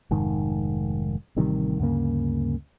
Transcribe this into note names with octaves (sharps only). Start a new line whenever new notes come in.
F1 G#2 D#3
A1 C3 D#3 G3
D2 G2 C#3 A#3